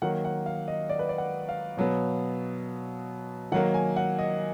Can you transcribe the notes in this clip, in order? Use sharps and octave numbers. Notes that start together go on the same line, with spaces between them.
D#3 F#3 A#3 F#5
F#5
F5
D#5
D5
B4
D5
F#5
F5
B2 F#3 B3
D#3 F#3 A#3 F#5
G#5
F#5
D#5